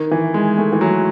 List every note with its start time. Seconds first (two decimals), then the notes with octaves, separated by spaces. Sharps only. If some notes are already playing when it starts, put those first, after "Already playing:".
Already playing: D#3
0.11 E3
0.34 G#3
0.58 A3
0.73 E3
0.81 F#3